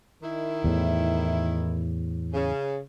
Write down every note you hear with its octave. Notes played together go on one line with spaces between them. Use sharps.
D#3 E4
E2 A2
C#3